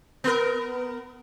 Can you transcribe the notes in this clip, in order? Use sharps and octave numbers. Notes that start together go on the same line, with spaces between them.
B3 A#4